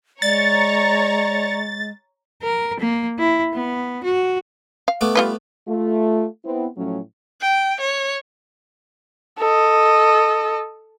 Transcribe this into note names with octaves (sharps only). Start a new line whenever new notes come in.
G#3 C#5 D5 A#5 C#6 A6
A#4
A#3
E4
B3
F#4
F5
A3 B3 D6
G3 F4 B4
A3 F4
B3 C4 E4
A2 F3 F#3 A3 C#4
G5
C#5
A4 D#5